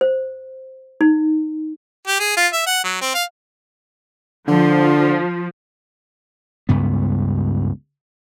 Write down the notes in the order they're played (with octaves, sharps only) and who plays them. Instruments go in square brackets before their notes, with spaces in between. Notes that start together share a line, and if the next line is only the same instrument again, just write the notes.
[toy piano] C5
D#4
[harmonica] G4
G#4
F4
E5
F#5
F#3
C4
F5
[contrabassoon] D3 [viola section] F3
[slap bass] C#2 G2 C#3 B3